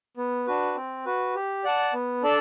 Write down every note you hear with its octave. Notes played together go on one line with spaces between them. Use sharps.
B3
D4 F#4 B4
C4
F#4 B4
G4
D5 F#5 A5
B3
D4 A4 D5 A5